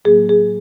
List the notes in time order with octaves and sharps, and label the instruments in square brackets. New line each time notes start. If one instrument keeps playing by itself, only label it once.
[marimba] A2 F#3 A#3 G#4
G#4